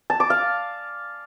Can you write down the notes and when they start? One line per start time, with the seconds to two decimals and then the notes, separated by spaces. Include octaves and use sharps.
0.10 A5
0.20 D6
0.30 F5